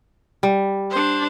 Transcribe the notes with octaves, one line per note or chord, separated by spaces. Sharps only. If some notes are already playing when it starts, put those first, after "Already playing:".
G3
D4 C5